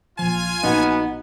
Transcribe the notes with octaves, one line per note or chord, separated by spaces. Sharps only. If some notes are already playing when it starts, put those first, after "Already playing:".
A#1 F3 F4 G#5
A#1 B3 D#4 F#4